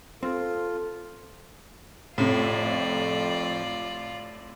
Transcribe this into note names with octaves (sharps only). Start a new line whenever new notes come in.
C4 F4 A4
F2 A2 C3 F4 D5